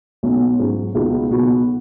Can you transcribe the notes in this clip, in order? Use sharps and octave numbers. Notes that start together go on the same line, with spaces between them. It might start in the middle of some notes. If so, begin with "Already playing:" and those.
B1 B2 F#3 C#4 F#4
G#2 F#3 C#4 F#4
C#2 B2 B3 D#4 F#4
B1 B2 B3 F#4